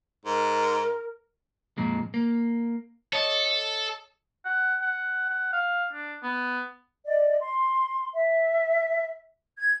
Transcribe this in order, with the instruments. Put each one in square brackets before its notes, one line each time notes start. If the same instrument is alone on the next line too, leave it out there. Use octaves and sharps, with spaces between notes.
[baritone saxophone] G#2 [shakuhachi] A#4
[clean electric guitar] F2 A#2 G#3
A#3
[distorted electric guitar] A4 [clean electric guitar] C#5 D#5
[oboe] F#5
F#5
F#5
F5
D4
B3
[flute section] D5 D#5
C6
E5
G#6